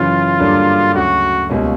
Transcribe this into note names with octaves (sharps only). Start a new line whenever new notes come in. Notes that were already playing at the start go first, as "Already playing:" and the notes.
Already playing: F#2 C#3 E3 F4
G2 D3 F#3 A#3 D4
D2 C#3 F#3 F#4
C#2 B2 G3 A#3 C#4